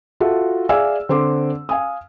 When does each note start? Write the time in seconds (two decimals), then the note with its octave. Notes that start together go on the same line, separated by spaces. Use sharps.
0.20 F4 F#4 A4 E5
0.69 G#4 D5 E5 F5 G#5 E6
1.09 D3 C4 C6 D6
1.69 F5 G#5 D#6